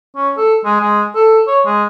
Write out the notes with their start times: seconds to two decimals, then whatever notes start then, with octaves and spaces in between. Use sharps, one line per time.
0.16 C#4
0.37 A4
0.65 G#3
0.80 G#3
1.15 A4
1.47 C#5
1.66 G#3